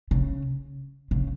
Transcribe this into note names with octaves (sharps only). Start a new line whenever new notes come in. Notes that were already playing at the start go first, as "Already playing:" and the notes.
C#3
C#3